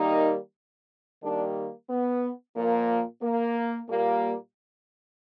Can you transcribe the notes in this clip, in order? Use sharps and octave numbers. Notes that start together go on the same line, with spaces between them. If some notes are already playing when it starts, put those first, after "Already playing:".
Already playing: D#3 G3 A#3 D#4
D#3 G3 A#3 D4
B3
A#2 F3 A#3
A#3
A#2 G3 A#3